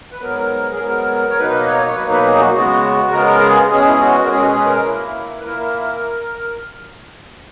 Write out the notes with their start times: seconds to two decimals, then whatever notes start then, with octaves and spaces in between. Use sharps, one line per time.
0.12 B4
0.21 G#2 F#3 B3 A#4
0.72 G#4
0.79 G#2 F#3 B3 A#4
1.30 C#5
1.38 B2 F#3 A#3 D#4 B4
1.58 D#5
1.66 C#5
1.87 C#5
1.95 B2 F#3 A#3 D#4 B4
2.11 B4
2.25 G#4
2.39 F#4
2.53 C#3 G#3 B3 F#4
3.11 C#3 G#3 B3 A#4
3.27 A#4
3.41 G#4
3.70 B2 G#3 C#4 G#4
3.87 E4
3.99 F#4
4.24 A#4
4.27 B2 G#3 C#4 G#4
4.42 F#4
4.48 G#4
4.58 B4
4.66 A#4
4.86 A#2 A#3 E4
5.40 B4
5.44 A#2 A#3 E4 A#4